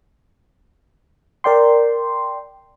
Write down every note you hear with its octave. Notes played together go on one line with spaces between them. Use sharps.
A#4 D5 G5 C6